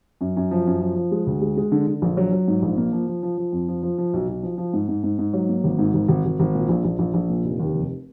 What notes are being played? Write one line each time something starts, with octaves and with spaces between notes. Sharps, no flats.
F#2
F#2
F3
F#2
F3
F3
G#3
D2
G#3
G#3
D3
D3
A#1
F#3
F#3
G#2
A#1
A#3
F3
F3
F3
F3
F2
F3
F3
F3
B1
B1
F3
F3
G#2
G#2
G#2
G#2
F#3
A#3
G#1
G#2
G#1
G#1
G#1
G#1
A#2
A#1
A#1
A#1
A#1
A#2
F1
D#2
F1